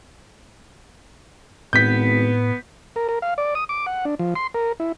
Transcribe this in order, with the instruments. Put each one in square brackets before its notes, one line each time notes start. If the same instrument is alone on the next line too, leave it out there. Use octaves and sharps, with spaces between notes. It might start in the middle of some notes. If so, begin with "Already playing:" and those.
[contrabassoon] G#1 [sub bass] A2 [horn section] B3 [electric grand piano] G6 B6
[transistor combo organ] A#4
A#4
F5
D5
D#6
D6
F#5
D4
F3
C6
A#4
E4